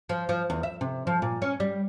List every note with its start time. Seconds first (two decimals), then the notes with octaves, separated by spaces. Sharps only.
0.09 F3
0.29 F3
0.50 E2
0.63 E5
0.81 C3
1.07 F3
1.22 A#2
1.42 C#4
1.60 G3